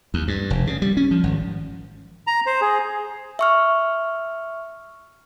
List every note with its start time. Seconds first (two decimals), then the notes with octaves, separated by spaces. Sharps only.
0.14 D#2
0.28 G2
0.50 F1
0.67 C#3
0.82 G3
0.97 C#4
1.11 F3
1.23 G#1
2.27 A#5
2.46 C5
2.61 G#4
3.39 E5 C#6 F6